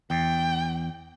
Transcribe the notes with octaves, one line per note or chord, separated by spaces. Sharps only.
E2 G5